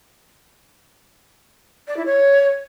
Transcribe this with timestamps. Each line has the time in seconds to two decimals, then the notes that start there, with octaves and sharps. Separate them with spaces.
1.88 D5
1.97 E4
2.06 C#5